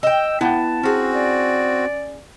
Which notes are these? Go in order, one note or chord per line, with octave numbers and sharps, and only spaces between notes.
D#5 G5 E6
B3 E4 F#5 G5 A5
C4 C#4 F#4 G#4
D5